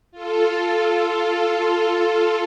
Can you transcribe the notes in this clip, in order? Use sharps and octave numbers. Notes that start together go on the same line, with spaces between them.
F4 A4